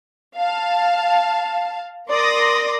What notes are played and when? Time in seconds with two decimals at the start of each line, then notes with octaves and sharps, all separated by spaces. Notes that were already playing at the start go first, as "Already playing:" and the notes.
0.37 F5 A5
2.09 A#4 D5 C6 D#6 A#6